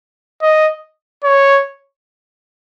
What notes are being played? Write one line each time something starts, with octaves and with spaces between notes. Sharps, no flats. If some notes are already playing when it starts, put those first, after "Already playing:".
D#5
C#5